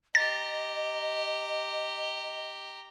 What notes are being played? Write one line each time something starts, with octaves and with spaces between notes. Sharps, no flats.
G4 D#5 A#5 A6